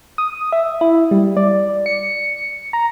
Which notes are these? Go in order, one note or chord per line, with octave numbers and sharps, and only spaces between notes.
D#6
E5
E4
G3
D5
C#7
A#5